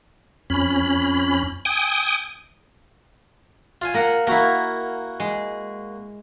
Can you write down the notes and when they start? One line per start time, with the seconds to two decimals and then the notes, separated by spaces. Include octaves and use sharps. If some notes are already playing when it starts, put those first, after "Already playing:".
0.50 F2 C#4 B5
1.65 G5 G#5 D#6
3.82 F4 F5 G#5
3.94 A#3 A#4 F#5
4.27 A#3 E4 F#4 A#4
5.20 G#3